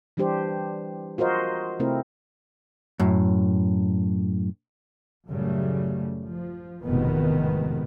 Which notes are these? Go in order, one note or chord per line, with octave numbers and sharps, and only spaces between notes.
E3 G3 D4 G4 C5
F4 F#4 A#4 C5 D#5
C3 A3 C4 E4 A#4
F#2 A2
A1 F#2 C#3 G3 A3
F3
F1 E2 G#2 B2 D#3 B3